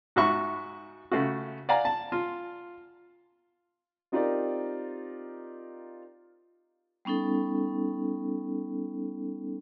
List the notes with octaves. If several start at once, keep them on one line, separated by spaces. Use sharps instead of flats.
G#2 F#4 E5 C#6
C#3 A3 F#4
D5 F5 F#5 G#5 A#5
A5
F4
C4 D#4 F4 G4 A#4 D5
G3 B3 C#4 D#4 A4